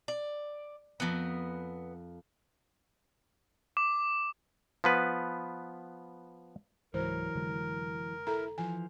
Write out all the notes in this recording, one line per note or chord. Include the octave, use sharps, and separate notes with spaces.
D5
F2 B3 A#4
D6
F3 B3 B4
C#2 G#2 E3 F#3 A#4 C5
F1 D3 G#3
E4 A4 A#5
E3 F3 G#5